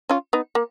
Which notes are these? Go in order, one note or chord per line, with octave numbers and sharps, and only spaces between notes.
C#4 F4
B3 D#4
A#3